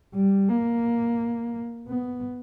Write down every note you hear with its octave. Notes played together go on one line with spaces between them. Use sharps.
G3
A#3
B3